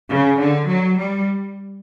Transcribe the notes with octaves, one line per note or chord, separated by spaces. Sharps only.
C#3
D3
F#3
G3